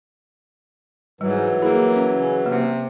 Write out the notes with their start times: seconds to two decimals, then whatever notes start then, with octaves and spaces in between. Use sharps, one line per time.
1.21 G#2 E3 F#3 G3
1.62 A#3 E4 G#4
1.96 C#4
2.17 C#3
2.46 C3 A#3